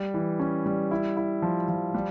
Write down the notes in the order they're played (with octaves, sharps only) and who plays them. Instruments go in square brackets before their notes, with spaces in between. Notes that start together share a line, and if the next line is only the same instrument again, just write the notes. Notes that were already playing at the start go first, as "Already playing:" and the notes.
Already playing: [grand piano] G3
E3
C#4
G3
E4
E4
F3
F3
G3